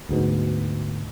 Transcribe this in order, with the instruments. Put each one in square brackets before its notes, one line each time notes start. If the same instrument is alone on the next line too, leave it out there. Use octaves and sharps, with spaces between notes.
[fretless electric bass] D2 G#2 B2